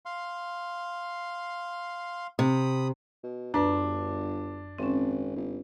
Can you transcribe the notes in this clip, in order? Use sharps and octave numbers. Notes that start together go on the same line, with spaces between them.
F5 C6
C3 B5 D#6
B2
G1 F#2 D4 B4
G#1 C4 C#4
G1